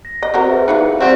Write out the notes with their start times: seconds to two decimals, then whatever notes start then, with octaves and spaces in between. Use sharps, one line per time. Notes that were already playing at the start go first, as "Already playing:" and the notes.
0.05 A#6
0.23 D#5
0.34 C4 F#4 A#4
0.50 G#4 B4 E5
0.68 E3 D#4 G#4 B4 F5 C#7
1.00 G3 A3 C4 F#4